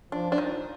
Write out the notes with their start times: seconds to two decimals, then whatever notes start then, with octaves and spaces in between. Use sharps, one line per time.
0.12 F3 D4
0.32 D4
0.38 D#4